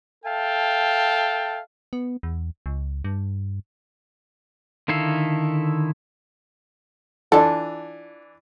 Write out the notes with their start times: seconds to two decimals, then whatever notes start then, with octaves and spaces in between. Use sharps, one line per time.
0.24 A4 E5 F5 G5 A5
1.93 B3
2.23 E2
2.66 C#2
3.04 G2
4.88 D3 D#3 E4 A4 F5
7.32 E3 D4 F4 A4